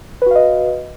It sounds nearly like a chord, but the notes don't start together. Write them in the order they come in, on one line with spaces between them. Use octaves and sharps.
B4 F#4 F5 D#5